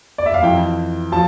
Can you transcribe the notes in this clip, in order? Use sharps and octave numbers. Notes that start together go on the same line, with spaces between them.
D5
E5
F5
F2 E3 G5
F3 A5